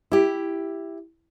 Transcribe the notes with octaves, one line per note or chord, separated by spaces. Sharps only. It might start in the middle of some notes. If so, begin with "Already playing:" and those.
E4 G4